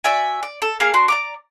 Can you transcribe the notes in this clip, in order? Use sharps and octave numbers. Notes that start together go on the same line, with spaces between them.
F#4 D5 E5 G#5
D5
A4
A#3 G#4 F5 G#5
D4 F#4 C6
D5 A#5 D6